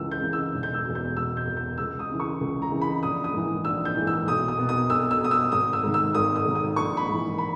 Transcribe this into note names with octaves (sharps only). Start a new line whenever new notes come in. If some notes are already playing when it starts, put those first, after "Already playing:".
Already playing: C#2 C#3 E3 E6
G6
C#3 E3
E6
E1
G6
E6
E2 B2
G6
E1 E6
G6
E2 B2
G6
C#2 E6
D#6
C#3 E3
C#6
C#2
A#5
C#3 E3
B5
A#1 D#6
D#6
G#2 E3
A#1 E6
G6
G#2 E3
E6
B1 D#6
D#6
B2
D#6
B1 E6
E6
B2 D#6
E6
G#1 D#6
E6
G#2 D#3
E6
G#1 D#6
D#6
G#2 D#3
D#6
A#1 C#6
B5
G#2 E3
B5